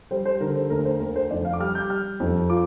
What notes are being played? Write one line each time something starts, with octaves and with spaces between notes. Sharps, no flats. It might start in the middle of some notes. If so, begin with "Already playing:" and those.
G3 C5
C5
D3 A#4
C5
D2 A#4
C5
D2 A#4
C5
F2 D5
F5
D6
G3 F6
G6
G3 F6
F2
F4 D6